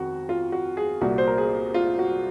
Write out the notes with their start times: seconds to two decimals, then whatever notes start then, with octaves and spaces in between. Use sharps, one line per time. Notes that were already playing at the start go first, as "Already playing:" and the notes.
Already playing: F2 D#3 F#4
0.29 F4
0.52 F#4
0.77 G#4
1.01 C2 A#2 F#4
1.18 C5
1.27 A#4
1.38 G#4
1.74 F4
1.99 F#4